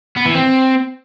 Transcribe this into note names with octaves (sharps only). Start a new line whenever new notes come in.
B3
E3
C4